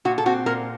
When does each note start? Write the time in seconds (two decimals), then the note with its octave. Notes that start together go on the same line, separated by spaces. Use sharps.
0.05 A#2 F#4
0.18 A4
0.26 C4 F#4
0.46 A#2 A#4